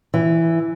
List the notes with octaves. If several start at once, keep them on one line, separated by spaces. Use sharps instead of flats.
E3